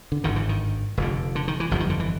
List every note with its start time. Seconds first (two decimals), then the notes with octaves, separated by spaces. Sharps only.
0.12 D3
0.24 G#1 G2 D3 D#3
0.36 E3
0.49 D#3
0.97 F1 F2 D3
1.35 D3
1.48 D#3
1.60 E3
1.71 G1 F2 D3 F3
1.80 D#3
1.90 D3
2.00 E3